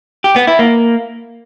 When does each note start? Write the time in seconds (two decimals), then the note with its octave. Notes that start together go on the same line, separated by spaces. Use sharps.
0.24 G4
0.36 B3
0.47 E4
0.59 A#3